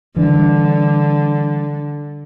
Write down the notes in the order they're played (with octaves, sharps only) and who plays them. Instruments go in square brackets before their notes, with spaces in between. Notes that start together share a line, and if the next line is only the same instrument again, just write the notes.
[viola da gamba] D3 [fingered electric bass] E3 G3 D4